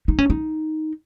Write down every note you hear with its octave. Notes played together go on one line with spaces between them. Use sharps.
D#4
C#4
D#4